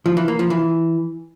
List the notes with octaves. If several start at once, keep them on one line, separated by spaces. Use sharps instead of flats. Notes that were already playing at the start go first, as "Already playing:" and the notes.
F3
E3
A#3
F3
E3